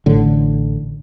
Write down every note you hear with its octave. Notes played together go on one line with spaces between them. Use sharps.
A1 A2 D3